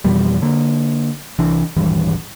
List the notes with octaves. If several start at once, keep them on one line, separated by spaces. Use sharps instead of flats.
F2 B2 E3 G3
D3 A#3
C2 E3 D4
D#1 G#1 G2 E3